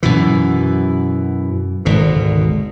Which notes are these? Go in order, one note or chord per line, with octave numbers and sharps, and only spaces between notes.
F#2 B2 E3
G#1 D2 B2